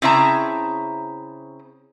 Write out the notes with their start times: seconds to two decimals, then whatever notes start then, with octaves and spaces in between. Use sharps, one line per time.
0.02 C#3 C4 E4 E5 A5 A#5